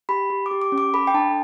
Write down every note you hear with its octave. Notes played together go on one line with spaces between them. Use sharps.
G4 B5
G4
D6
G4
D6
C#4
D6
A4 B5
G5
D4 A5